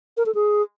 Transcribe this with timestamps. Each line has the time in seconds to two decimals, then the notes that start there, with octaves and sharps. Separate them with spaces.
0.17 A#4
0.26 A4
0.34 G#4